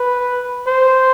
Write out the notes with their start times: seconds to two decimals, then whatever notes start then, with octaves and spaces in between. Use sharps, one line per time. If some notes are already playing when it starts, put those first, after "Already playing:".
Already playing: B4
0.67 C5